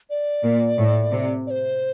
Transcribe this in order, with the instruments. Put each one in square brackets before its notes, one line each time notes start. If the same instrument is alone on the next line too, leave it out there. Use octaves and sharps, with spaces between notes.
[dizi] D5
[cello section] A#2
A2
C3
[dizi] D5
C5